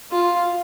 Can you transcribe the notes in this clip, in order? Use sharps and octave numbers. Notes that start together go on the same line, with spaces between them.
F4